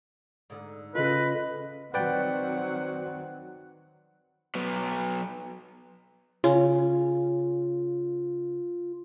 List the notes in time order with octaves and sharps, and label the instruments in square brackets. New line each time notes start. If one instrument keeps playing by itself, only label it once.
[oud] G#2 D3
[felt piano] C#3 F4 [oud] A4 [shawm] B4 [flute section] D#5
[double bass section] D#3 F#3 C4 [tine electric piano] B4 D5 G5 [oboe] F#5
[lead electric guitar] F#3 B3
[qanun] C#3 C#4 [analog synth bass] F4